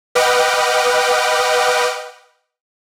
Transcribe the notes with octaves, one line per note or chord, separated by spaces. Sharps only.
B4 D#5 F#5 G5 D6 F6